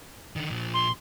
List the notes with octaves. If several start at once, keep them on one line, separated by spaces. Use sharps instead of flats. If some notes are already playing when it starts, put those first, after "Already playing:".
D3 D#3
A#2 F3
C6